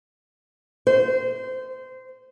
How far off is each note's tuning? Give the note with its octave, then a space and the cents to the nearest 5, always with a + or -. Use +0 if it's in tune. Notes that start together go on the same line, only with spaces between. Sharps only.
C5 -20